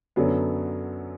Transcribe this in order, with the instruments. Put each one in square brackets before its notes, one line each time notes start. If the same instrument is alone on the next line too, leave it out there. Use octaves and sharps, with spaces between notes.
[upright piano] F#2 D3 F#3 B3